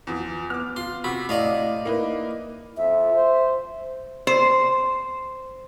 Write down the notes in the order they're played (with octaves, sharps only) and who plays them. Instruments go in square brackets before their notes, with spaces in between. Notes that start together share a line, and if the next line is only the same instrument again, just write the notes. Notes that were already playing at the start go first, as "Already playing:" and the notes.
[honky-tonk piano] E2 F3
[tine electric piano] B3 [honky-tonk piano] D6 F6
[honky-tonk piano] F4 [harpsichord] C6
[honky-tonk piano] C3 [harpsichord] F#4 [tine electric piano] B5
[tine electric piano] A2 [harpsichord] D5 D#5 F5
[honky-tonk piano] A#3 D#4 B4 [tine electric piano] E4
[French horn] F2 [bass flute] E5
[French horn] C5
[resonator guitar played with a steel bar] C5